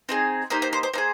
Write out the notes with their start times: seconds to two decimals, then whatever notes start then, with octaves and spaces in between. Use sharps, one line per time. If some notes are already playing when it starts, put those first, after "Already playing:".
0.09 C4 D#4 G#4
0.50 A#3 D#4 G4 C5
0.62 C5
0.73 C5
0.83 C5
0.94 A#3 D#4 C5
0.98 G#4